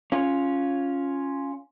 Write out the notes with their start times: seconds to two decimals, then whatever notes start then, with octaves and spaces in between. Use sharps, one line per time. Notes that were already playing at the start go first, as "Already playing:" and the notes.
0.12 C#4 F4